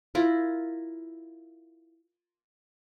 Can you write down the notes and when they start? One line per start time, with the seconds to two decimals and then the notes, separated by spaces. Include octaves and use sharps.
0.15 E4 F4 A#4